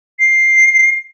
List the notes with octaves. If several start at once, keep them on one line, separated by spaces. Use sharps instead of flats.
C7